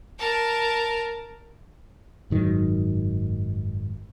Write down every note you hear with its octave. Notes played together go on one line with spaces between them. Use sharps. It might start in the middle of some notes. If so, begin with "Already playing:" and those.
A#4 A5
F#1 G#2 D#3 F#3